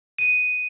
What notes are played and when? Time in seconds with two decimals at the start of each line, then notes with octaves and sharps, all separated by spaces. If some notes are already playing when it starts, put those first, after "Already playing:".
0.19 D#7